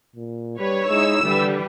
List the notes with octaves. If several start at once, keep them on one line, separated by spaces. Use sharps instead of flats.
A#2
G3 D4 B4 C#5
G#3 D#4 E4 E6
D3 E3 G3 B4